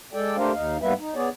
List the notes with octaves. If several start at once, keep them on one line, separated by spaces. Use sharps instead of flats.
G#3 A4 D5 G5
A3 D4 G4 A#4 C5 F5
D#2 D#4 F5
G#2 G3 A#3 B3 B4 E5
D#4
B3 G#4 C#5 D5